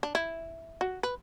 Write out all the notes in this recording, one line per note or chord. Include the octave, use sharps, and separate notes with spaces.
D4
E4
F#4
B4